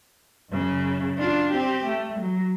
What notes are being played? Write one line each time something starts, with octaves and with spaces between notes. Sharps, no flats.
F#2 C#3
D4 F4
C4 G4
A3
F#3